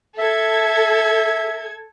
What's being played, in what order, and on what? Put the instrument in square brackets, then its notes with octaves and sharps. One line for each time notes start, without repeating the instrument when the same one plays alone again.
[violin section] A4 G#6 [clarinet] E5